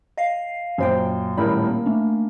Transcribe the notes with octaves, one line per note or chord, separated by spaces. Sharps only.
D#5 F5 C7
F#2 A#2 C#4 C5 G5
D#1 A2 A#4 B5
A#3
A3 C#4 D4